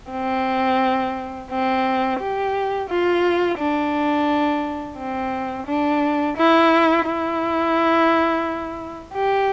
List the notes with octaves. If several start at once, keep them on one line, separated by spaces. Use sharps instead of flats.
C4
C4
G4
F4
D4
C4
D4
E4
E4
G4